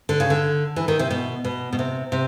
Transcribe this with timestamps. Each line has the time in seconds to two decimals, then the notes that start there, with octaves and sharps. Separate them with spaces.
0.09 D3
0.20 C#3
0.30 D3
0.76 E3
0.88 D#3
0.99 C3
1.10 B2
1.45 B2
1.73 B2
1.79 C3
2.12 C3